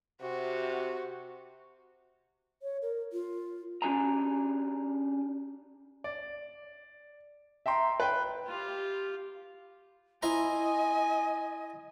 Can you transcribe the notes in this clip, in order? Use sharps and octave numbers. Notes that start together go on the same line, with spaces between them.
C3 F#4
C#5
A#4
F4
C#4 D4 G4 G#4 G#5 A#5
D5
E5 G5 A#5 C6
B4 G5
F4 G4
E4 C5 D#5 G#5 A#5